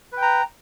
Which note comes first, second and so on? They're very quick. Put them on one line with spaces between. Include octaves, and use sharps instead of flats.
B4 G5 A#5